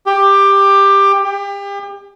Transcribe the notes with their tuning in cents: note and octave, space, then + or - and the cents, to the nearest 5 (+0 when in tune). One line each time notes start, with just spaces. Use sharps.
G4 +15
G4 +35